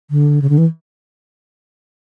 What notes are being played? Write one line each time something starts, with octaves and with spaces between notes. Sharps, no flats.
D3
C#3
D3
E3